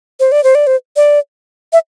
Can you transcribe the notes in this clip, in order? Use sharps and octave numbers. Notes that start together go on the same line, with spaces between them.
C5
D5
C5
D5
C5
D5
E5